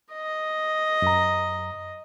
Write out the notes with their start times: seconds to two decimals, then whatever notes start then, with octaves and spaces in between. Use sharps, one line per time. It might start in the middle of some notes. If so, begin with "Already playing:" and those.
0.14 D#5
1.02 F#2 A#5